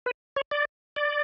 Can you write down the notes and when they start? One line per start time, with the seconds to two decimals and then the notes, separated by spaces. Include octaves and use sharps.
0.06 B4
0.36 C#5
0.51 D5
0.96 D5